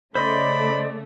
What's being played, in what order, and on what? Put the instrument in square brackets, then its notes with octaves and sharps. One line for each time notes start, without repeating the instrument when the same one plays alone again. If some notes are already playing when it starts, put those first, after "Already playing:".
[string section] C#3 A3 [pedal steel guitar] C5 D#5 C6 [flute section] D5 [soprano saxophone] B5